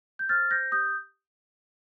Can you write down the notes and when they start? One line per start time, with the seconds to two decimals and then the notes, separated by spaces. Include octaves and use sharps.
0.19 G6
0.29 C5 F6 A6
0.51 C5 G6 A#6
0.72 G4 D#6 G6